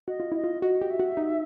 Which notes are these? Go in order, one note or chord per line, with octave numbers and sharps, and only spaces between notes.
F#4 D#5
F4
E4 D#5
F4
F#4 D#5
G4
E5
F#4
D#4